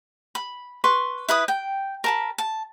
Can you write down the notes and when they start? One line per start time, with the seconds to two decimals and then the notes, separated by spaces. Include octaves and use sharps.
0.35 B5
0.84 B4 C6 C#6
1.28 E4 B4 B5 D#6
1.48 G5
2.04 A#4 A5 B5
2.38 A5